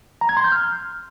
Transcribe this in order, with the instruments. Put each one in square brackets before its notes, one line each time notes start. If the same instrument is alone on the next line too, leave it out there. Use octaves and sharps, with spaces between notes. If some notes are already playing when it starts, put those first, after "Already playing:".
[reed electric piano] A#5
G#6
C6
G6
F6